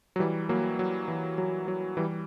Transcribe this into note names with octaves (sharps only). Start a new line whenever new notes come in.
F#3
E3 G3
F#3 A#3
F#3
E3
F#3
F#3
E3 G3